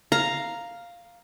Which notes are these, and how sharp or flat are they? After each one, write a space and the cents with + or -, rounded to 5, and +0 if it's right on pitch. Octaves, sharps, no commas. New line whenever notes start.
F5 +0 A#5 +0